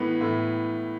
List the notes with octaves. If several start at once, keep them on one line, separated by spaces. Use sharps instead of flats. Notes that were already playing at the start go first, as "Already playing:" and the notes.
Already playing: A2 E3 B3
A2